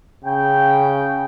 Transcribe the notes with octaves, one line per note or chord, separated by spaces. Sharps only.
C#3 G5